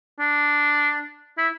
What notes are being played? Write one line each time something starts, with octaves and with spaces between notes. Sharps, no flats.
D4
E4